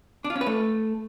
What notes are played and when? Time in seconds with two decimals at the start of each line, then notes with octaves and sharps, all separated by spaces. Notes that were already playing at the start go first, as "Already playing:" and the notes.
0.24 D4
0.30 F4
0.36 C#4
0.41 B4
0.47 A3